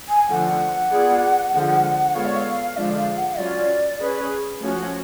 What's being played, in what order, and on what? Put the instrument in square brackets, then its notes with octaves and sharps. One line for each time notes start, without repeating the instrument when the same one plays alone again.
[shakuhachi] G#5
[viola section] D3 F3 A3 F4 [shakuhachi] F#5
[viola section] B3 F4 G#4 D5
D3 F3 G#3
[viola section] G#3 B3 F4 A4 C#5 [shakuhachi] F5
[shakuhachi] D5
F5
[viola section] D3 F3 G#3 D4 F4 [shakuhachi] D5
[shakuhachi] F5
F#5
[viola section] F#3 C#4 F4 [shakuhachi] D5
[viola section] C#4 G#4 B4
F3 A3 C#4 F#4